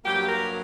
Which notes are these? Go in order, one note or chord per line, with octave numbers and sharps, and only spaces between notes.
G2 F#3 A#3 G4
A#4